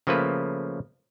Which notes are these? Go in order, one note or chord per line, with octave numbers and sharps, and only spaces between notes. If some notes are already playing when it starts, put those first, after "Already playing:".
C#3 F3 A3 A#3 B4